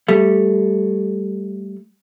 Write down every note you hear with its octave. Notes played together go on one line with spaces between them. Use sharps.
G3 A3